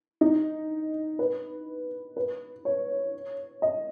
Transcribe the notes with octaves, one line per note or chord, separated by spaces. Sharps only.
D#4
B4
B4
C#5
D#5